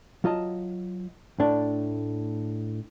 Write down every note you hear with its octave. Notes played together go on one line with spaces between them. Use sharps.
F#3 F4 D#5 A5
A2 A3 D4